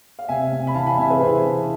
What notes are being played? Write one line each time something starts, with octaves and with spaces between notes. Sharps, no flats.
F5
C3 E5 G#5
C3
B5
E3 F5 A5
G#5 B5
C3 E5 G#5
G#4 B4
E3 C5 E5
E3